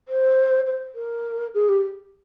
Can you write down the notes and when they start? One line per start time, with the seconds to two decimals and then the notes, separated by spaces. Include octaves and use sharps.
0.08 C5
0.66 C5
0.95 A#4
1.54 G#4
1.69 G4